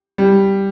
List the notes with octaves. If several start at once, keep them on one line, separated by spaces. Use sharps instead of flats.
G3